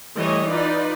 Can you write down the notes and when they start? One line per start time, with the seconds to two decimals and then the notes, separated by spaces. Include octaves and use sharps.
0.17 E3 G3 A3 C#5 D#5
0.50 D#4 F4 B4 D5